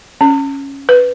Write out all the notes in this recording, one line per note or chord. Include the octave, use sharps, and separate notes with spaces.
C#4
B4